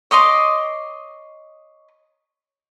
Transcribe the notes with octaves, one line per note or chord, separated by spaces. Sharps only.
C#5 D#5 C6 D6